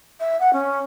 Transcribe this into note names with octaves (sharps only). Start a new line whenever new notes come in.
E5
F#5
C#4